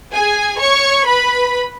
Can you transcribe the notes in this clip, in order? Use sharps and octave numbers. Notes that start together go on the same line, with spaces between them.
G#4 G#5
C#5 C#6
B4 B5